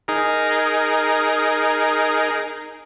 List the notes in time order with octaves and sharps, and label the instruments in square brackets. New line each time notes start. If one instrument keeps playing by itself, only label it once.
[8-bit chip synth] D#4 G#4 A#4